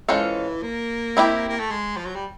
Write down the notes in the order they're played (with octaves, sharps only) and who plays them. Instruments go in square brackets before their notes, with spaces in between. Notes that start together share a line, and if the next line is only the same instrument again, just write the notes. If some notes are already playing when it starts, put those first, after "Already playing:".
[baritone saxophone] E3 [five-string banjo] G#3 C#4 F4 A4 C5
[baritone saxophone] A#3
[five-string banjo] C4 E4 G4
[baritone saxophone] A#3
A3
G#3
F3
F#3
G3